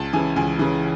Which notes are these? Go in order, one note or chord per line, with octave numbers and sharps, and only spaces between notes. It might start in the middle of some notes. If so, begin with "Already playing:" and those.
Already playing: C#2 A5
C#3 E3 G#5
C#2 G#5
C#3 E3